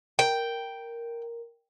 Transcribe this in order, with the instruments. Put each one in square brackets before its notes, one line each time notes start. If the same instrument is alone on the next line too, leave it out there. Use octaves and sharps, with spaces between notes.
[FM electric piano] A#4 [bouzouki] G5